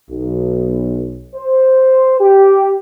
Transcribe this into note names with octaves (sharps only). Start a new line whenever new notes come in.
B1
C5
G4